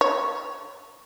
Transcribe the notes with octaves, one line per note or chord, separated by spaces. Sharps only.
C#5